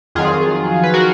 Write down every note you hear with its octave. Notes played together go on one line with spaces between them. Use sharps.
F2 D#3 F#3 F4 G#4
B4
F#4 A#4